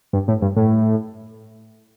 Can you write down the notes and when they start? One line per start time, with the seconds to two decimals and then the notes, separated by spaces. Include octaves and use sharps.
0.13 G2
0.28 A2
0.42 G2
0.56 A2